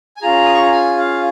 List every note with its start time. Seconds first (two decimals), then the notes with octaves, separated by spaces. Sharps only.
0.17 G#5
0.21 C#4 F4 G#4 A#5
0.46 D#6
0.54 C#6
0.64 A#5
0.72 G#5
0.98 F5